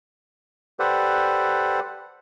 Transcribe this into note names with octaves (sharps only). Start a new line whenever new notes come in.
G4 A4 B4 C5 D5 F#5